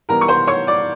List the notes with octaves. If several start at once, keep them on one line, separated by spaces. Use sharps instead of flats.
E3 G3 B3 A#4 A#5
C#6
C5 C6
C#5 C#6
D5 D6